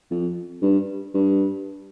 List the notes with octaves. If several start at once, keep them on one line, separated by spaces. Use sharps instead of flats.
F2
G2
G2